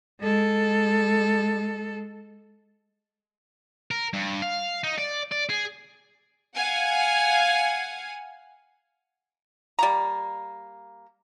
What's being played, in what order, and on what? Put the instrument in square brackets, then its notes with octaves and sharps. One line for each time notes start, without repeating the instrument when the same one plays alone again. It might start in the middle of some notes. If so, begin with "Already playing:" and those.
[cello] G#3 A4
[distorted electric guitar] A#4
G2
F5
D#4
D5
D5
G#4
[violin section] F5 F#5 G#5
[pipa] G3 A#3 A#5